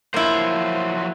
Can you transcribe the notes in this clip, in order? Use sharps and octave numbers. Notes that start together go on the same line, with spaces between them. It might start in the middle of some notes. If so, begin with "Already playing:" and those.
F3 F#3 A#3 E4 C5